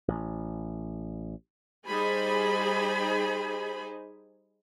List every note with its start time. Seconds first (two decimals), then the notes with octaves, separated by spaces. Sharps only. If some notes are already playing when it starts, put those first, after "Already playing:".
0.08 A1
1.88 G3 D#4 G#4 C5 G#5 B5